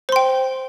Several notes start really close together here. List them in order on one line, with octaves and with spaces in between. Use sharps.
C5 C6 G5